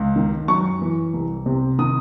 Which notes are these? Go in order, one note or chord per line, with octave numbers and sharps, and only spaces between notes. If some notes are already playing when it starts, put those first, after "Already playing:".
Already playing: C#2
D#3
F#2 C#6
E3
C2
C3
D#3 D#6